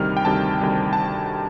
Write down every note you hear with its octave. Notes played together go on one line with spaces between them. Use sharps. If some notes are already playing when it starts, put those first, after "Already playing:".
Already playing: D2 C3 D#3 G3 F6
G5
D2 C3 D#3 G3 A5
D2 C3 D#3 G3
A5